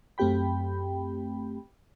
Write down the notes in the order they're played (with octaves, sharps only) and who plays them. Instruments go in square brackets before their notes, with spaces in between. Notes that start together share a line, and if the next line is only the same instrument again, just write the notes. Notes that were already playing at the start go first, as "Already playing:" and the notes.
[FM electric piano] F#2 A3 C4 G4 G5 B5